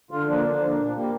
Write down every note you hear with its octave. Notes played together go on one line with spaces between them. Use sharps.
D3 F4
F3 A#3 D4
D3 D4
F3 A#3
A#2
G3 A#3